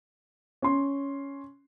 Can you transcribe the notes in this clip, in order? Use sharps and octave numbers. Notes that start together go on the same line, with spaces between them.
C#4 C6